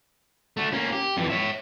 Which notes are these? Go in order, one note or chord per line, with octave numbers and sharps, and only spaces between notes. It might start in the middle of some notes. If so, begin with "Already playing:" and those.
A3 F#4
A#3 C#4
G4
F2 E3
C#5 E5